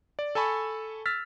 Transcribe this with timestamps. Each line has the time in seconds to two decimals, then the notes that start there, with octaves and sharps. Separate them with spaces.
0.19 D5
0.35 A4 G#5 A5 B5 C#6
1.06 E6 F6 A6 B6